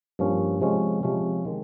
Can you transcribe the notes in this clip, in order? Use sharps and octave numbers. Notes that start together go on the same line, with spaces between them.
G2 F3 A#3 C#4
C3 F3 G#3 C#4
C3 F3 G#3 C#4
D#3 G#3